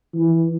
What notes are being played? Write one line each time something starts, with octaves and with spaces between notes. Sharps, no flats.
E3